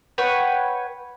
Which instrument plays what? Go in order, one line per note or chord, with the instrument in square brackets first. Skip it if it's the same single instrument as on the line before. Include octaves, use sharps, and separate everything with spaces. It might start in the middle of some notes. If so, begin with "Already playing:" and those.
[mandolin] B4 C#5 F#5 G5